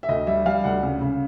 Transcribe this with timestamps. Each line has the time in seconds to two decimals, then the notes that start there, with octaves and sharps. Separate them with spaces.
0.03 E5
0.09 D2 D#5
0.27 G3 E5
0.46 G3 F5
0.64 D2 F#5
0.83 C#3
1.01 C#3